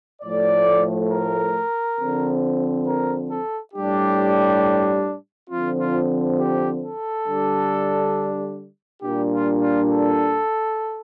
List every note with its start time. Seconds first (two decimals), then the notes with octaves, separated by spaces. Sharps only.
0.22 A2 F3 A3 D5
1.10 A#4
1.99 D3 F3 C4
2.86 A#4
3.30 A4
3.74 A2 G3 D4 G4
5.50 D3 F3 C4 F4
5.80 F4
6.37 G4
6.82 A4
7.26 D3 G3 D4
9.01 A#2 G3 D4 G4
9.31 F4
9.60 F4
9.90 A4